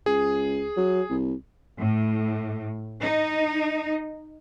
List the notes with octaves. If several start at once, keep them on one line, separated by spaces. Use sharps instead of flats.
C#2 G#4
F#3
C2
A2
D#4